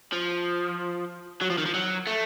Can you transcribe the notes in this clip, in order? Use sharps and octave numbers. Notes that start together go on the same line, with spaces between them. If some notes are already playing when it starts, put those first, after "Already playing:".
F3
F#3
F3
D#3
F3
F#3
A3